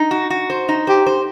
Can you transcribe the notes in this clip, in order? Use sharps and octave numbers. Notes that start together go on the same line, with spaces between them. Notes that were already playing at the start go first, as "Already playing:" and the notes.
Already playing: D#4
F#4
F#4
C5
D#4
G4 C5
C5